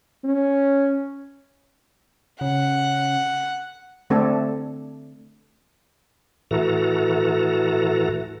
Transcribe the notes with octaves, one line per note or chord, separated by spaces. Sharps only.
C#4
C#3 F#5
D3 A3 C4 D4 A4
A2 E3 F#4 A4 A#5